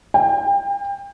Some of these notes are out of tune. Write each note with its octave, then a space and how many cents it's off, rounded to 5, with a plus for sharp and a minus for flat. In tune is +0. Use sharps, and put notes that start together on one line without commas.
G5 +30